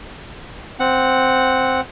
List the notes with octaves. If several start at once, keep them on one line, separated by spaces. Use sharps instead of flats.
C4 F#5